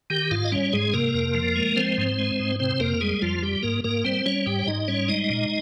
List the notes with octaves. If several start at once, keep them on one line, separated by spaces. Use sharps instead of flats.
D#3 G4 G5
G#2 F4 F5
D#5
G3 C#4 C#5
G#2 G#3 G#4
C3 A#3 A#4
F2
F3
G#3
F3 C4 C5
G#2
G#3
G#2
C3 C4 C5
F2 A#3 A#4
G3 G#3 G#4
F2 F3 F4
G3 G4
G#2 A#3 A#4
G#2 A#3 A#4
G3 C4 C5
G3 C#4 C#5
G#2 G4 G5
C#5
G#2 D#4 D#5
G3 C#4 C#5
G#3 D#4 D#5
A#2